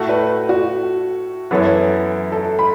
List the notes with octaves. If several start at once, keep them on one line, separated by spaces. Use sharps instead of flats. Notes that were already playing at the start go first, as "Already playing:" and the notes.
Already playing: A2 A3 F#4
B4
F#4
F#2 E3 B3 A4 C#5
A4
B5